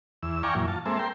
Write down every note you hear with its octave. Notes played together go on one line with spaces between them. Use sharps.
E2 E6
D5 F5 G5 G#5 A#5 C#6
F#2 A#2 E3
F4 A5
G#3 A#3 C4 A4 E5
A#4 G5 C6